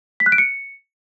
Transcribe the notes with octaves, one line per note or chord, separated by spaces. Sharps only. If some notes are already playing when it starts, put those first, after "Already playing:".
B6
F#6
D7
C#7